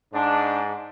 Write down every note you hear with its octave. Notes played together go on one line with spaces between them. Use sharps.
G#2 D4